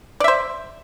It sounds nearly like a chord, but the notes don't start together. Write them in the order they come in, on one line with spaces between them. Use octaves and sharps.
D5 E5 C5